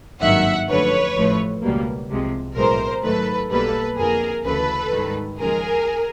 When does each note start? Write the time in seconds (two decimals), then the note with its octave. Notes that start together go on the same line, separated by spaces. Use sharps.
0.21 G#1 G2 D#3 F#3 A#3 E5 F#5
0.68 F#2 D3 F3 A3 B4 C#5
1.15 A1 A2 F3 A3
1.62 C#2 B2 G3 A#3
2.09 C2 C3 F3 G#3
2.56 B1 A2 E3 G#3 A#4 C5
3.03 G#2 D#3 F#3 A3 A4 B4
3.50 B1 B2 G3 A#3 A4 B4
3.97 F2 D3 F3 A#3 G#4 A#4
4.44 D2 C#3 E3 A4 B4
4.91 G#2 D#3 G3
5.38 D#2 C#3 F3 G#3 G#4 A#4